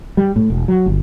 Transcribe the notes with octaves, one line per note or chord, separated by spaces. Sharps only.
G3
A2
E1
F#3
G1